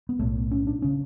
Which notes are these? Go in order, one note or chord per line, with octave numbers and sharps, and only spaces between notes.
B3
B1 A2 A3
C#4
D4
C#3 C#4